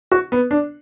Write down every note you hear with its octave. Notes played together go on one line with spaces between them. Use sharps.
F#4
B3
D4